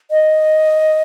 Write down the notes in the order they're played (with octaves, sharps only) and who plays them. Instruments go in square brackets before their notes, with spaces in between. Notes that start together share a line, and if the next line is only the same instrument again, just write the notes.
[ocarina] D#5